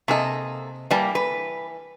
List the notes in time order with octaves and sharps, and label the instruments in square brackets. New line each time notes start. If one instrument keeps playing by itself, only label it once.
[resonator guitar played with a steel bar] C3 D#5 [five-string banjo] A#3 G#4 A4
[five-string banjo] E3 D5 A5 [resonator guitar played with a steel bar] G3 A#3
[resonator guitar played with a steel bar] B4